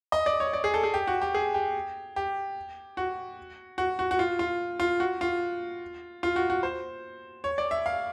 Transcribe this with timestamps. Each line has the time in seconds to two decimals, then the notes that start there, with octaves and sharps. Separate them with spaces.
0.12 D#5
0.26 D5
0.40 C#5
0.53 D5
0.64 G#4
0.74 A4
0.84 G#4
0.94 G4
1.07 F#4
1.21 G4
1.34 G#4
1.54 G4
2.16 G4
2.97 F#4
3.78 F#4
3.99 F#4
4.11 F#4
4.19 F4
4.39 F4
4.80 F4
5.00 F#4
5.21 F4
6.23 F4
6.36 F#4
6.50 F#4
6.63 C5
7.44 C#5
7.58 D5
7.71 E5
7.86 F5